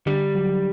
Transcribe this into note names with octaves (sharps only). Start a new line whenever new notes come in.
D3 G3
F#3